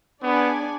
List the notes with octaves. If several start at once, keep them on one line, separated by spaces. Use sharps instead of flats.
B3 D4 G#4 D5 G#5